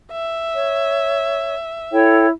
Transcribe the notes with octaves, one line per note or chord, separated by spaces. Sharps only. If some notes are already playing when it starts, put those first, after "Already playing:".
E5
C#5
E4 A4 C#5 G5